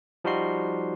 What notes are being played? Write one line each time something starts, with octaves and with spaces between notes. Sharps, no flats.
F3 G3 D#4 F#4 C6 C7